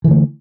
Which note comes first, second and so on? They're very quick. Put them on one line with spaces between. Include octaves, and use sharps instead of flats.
E3 D3 A3